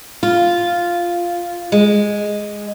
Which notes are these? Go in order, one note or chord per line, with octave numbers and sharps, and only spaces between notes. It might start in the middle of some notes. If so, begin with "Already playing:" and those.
F4
G#3